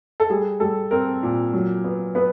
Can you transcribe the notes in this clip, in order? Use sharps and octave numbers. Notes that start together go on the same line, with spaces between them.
A4
G3 G#4
G3 A4
C4 A#4
A#2
F#3
B3
B3 B4